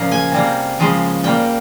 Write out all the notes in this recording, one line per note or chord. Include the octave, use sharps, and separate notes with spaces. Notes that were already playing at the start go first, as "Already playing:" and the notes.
Already playing: A#2 C#3 F3 A#3
G#5
C3 G3 A#3
C#3 F3 G#3
A#2 G3 A#3 G5